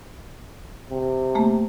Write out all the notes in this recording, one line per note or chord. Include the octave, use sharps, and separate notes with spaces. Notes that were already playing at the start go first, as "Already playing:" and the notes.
C3
A3 A#3